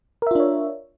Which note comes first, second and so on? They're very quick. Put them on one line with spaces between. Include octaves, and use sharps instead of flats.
A#4 E5 F4 D4 C#5